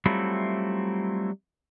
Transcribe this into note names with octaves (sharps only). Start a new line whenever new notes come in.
F#3 G3 A3 C4 E4 F4